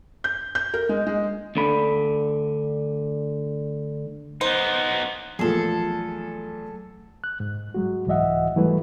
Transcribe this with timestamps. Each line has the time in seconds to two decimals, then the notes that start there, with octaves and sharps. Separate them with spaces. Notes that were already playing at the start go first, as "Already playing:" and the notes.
0.24 G6
0.55 G6
0.74 A#4
0.89 G#3
1.07 G#3
1.56 D2 D3 B5
4.41 B3 D#4 C5
5.39 E2 A#2 F3 F#3 A3 G#4 A4
7.24 F#6
7.40 G#2
7.74 F#3 G#3 F#4
8.07 C2 G#2 E3 D#5 E5 F#5
8.56 E3 F#3 G3 A3 E4 B4